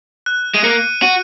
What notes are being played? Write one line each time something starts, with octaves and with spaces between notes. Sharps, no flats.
F#6
G#3 D#7
A#3 C#7
F#4 D#7